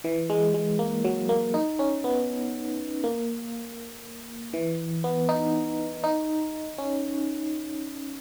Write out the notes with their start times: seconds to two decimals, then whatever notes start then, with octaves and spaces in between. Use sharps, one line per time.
0.04 E3
0.30 G#3
0.54 G#3
0.79 A#3
1.05 F#3
1.29 A#3
1.54 D#4
1.79 C#4
2.04 B3
3.04 A#3
4.53 E3
5.04 B3
5.29 D#4
6.04 D#4
6.78 C#4